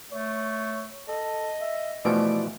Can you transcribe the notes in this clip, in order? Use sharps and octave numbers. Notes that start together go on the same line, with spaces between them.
A3 C#5
A4 D#5
E5
B2 E3 F3 A3 D5 D7